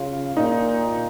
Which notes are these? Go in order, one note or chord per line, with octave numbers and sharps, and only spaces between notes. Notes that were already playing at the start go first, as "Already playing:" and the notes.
Already playing: C#3 F4
A#2 D#4